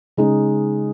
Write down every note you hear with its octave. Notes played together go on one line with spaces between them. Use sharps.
C#3 G#3 D#4